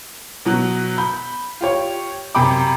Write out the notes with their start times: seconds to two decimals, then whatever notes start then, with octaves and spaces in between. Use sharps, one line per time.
0.45 B2 F#3
0.98 B5 G6
1.61 F4 G4 C#5
2.35 F#2 C3 G4 G5 B5 D6